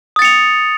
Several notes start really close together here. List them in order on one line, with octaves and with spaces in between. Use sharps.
D#6 A6 C#7 F7